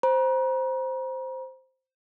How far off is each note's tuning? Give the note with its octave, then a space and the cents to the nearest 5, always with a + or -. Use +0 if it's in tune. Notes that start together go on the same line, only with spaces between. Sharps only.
C5 +0 A#5 +40